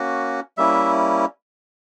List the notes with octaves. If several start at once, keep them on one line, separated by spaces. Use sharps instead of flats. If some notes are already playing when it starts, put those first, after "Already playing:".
Already playing: A#3 C#4 F#4
G3 A#3 C#4 E4 E5